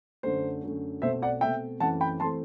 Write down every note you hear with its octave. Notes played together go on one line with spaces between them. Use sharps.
F#2 D3 A3 C5
F#2 D3 A3
B2 A3 C4 C5 E5
D5 F#5
B2 A3 C4 E5 G5
F#2 E3 A3 C4 F#5 A5
G5 B5
E3 A3 C4 A5 C6